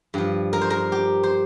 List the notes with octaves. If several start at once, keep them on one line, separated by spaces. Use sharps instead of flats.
G2 F3
A#4
C5
A#4
G4
C5